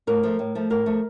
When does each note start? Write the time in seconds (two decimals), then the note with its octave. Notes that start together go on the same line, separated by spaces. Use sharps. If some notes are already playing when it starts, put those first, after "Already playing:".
0.07 A2 A#4
0.23 F3 A3
0.39 A2
0.55 F3 A3
0.70 A2 A#4
0.86 F3 A3